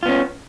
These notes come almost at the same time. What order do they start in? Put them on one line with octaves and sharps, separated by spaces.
F4 B3 C#4